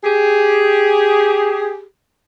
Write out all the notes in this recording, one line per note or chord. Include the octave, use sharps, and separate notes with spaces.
G4 G#4